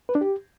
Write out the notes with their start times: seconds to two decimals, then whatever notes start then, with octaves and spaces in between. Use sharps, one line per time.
0.09 B4
0.15 D4
0.21 G4